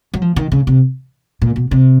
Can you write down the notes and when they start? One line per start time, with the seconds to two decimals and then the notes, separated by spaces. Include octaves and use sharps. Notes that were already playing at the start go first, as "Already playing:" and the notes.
0.14 F#3
0.22 F3
0.36 D#3
0.52 C#3
0.67 C3
1.42 A#2
1.56 B2
1.71 C3